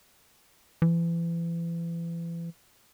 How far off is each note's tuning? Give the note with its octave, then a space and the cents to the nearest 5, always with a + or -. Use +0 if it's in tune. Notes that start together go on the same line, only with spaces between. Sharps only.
E3 +35